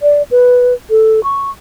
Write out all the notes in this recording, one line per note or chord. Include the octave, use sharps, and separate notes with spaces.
D5
B4
A4
C#6